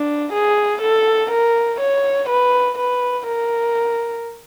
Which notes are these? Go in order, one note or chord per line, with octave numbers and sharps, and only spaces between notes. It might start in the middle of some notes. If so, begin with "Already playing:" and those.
Already playing: D4
G#4
A4
A#4
C#5
B4
B4
A#4